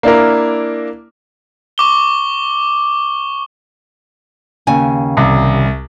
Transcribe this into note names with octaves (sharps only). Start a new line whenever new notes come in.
A#3 D4 E4 A#4
C#6 D6 G7
D#2 C#3 G#5
C2